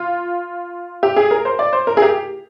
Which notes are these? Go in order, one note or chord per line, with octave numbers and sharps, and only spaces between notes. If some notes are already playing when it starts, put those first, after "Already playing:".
Already playing: F4
G4
G#4
A#4
C5
D5
C5
A#4
G#4
G4